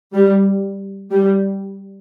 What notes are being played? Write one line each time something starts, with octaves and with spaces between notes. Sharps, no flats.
G3
G3